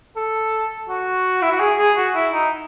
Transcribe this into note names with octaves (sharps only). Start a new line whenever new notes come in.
A4
F#4
E4
F#4
G#4
G#4
F#4
E4
D#4